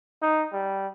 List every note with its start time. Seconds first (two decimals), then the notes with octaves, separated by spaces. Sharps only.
0.22 D#4
0.53 G3